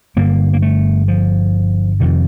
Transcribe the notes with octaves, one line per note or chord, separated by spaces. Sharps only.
G1 G2 D3 A#3
A#3
A3
F3
F2 C3 D#3